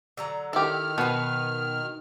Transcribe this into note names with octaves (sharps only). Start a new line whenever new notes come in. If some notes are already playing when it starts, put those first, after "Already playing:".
D3 F#3 A#5
D#3 E4 G4 A4 F6
B2 B3 B4 F#5